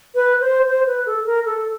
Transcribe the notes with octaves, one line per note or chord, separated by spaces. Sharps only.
B4
C5
C5
B4
A4
A#4
A4